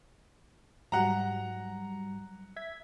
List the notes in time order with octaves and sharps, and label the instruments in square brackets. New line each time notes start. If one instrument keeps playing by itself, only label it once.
[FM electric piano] G#2 F#3 G3 [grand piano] F#5 A#5
[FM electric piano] E5 G#6 B6